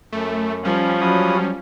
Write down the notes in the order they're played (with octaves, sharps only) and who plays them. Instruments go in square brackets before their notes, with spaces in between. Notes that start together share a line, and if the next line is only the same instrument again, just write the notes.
[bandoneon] F#2 [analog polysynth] A3
[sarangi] F3 [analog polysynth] G3 C#4
[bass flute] F#3 [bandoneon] E4 F#4 D#6